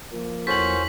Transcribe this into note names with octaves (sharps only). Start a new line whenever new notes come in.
F3 A#3
E2 C#4 F#4 A4 C5 B6 F#7